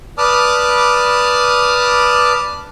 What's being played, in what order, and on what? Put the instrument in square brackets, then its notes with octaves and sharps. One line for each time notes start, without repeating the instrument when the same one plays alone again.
[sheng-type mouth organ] B4 D5 A5 D6 D#6 F6